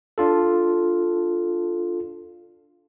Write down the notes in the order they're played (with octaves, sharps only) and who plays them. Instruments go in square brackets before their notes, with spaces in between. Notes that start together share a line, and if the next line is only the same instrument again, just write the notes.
[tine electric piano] D4 F4 A4